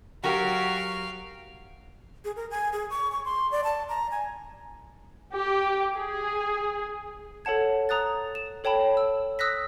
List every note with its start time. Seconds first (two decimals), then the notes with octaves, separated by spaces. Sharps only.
0.24 F#3 F#4 G4 A#4 F5 G5
2.25 G#4
2.36 A#4
2.51 G#5
2.72 G#4
2.90 C#6
3.12 C#6
3.25 C6
3.51 D5
3.64 A5
3.89 A#5
4.11 G#5
5.35 G4
5.95 G#4
7.45 A4 C#5 F#5 A5 G#6
7.89 A#5 D#6 F#6 A6
8.35 E7
8.64 A4 C#5 G5 A5 B5
8.97 E6
9.39 D#6 E6 F#6 A#6 B6